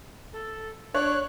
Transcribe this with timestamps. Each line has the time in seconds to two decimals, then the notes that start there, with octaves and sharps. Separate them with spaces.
0.33 A4
0.94 D4 C#5 F#6